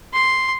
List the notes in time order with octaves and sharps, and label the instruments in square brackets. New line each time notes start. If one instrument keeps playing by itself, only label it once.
[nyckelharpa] C6